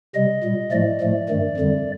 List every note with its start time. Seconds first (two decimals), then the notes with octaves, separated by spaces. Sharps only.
0.15 C3 G3 D#5
0.43 A#2 G3
0.72 A2 F3 A3 D5
1.01 A2 F3 A3
1.29 G2 D#3 A3
1.57 F2 D3 G3